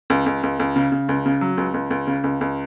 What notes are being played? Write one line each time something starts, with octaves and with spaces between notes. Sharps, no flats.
C#2
C#2
C#2
C#2
C#3
C#3
C#2
C#3
F#3
C#2
C#2
C#2
C#3
C#2
C#2